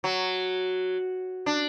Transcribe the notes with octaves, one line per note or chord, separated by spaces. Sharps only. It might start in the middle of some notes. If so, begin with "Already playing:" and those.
F#3
D4